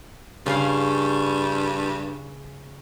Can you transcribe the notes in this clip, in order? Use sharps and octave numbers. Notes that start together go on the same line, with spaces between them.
G2 C#3 C#4 F5